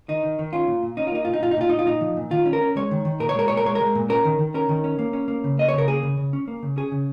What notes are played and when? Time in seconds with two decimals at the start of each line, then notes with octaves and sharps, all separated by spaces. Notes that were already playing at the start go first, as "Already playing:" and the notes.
0.08 D#3 D#4
0.23 D#3
0.39 D#3
0.53 C#4 F4
0.68 A#2
0.83 A#2
0.97 C#4 D#4
1.07 F4
1.12 A#3 D#4
1.25 A#2 F4
1.33 D#4
1.42 A#2 F4
1.51 D#4
1.57 A#2 F4
1.70 A#2 D#4
1.79 F4
1.87 A#2 D#4
2.01 F3
2.17 A#2
2.31 D#3 F4
2.46 C#4
2.53 A#4
2.62 C#4
2.76 G#3 C#5
2.91 D#3
3.05 D#3
3.20 A#2 A#4
3.29 C#5
3.35 G#3 A#4
3.48 A#2 C#5
3.57 A#4
3.65 G#3 C#5
3.75 A#4
3.80 G#3
3.95 A#2
4.09 C#4 A#4
4.25 D#3
4.39 D#3
4.54 C#4 A#4
4.69 D#3
4.84 C#4
4.99 A#3
5.13 C#4
5.28 A#3
5.44 C#3
5.58 A#3 D#5
5.69 C#3 C#5
5.78 A#4
5.88 A#3 G#4
6.03 C#3
6.17 C#3
6.33 C#4
6.48 A#3
6.63 C#3
6.77 C#4 G#4
6.92 C#3